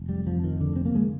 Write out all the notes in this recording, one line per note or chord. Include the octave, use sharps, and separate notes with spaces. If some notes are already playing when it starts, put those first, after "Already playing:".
Already playing: F1
G3
F2 F3
D#3
F1 D3
C4
A#3
D3 G#3